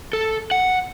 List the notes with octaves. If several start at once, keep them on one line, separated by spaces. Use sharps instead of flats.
A4
F#5